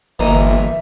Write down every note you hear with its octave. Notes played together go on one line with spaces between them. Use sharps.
G1 E3 A#3 D#4 E5